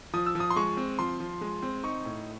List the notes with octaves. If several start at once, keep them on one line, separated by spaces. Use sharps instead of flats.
F3 D#6
E6
F3
D#6
C6
G#3 C#6
C4
F3 C6
F3
G#3
C4
D#4 C#6
A2